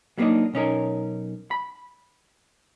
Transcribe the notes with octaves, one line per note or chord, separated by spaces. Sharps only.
F#3 G3 A#3 B3 D4 D#4
B1 C#4 D#4 A#4
B5